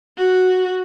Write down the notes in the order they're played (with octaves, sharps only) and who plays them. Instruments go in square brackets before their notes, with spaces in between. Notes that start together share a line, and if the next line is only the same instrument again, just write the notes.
[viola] F#4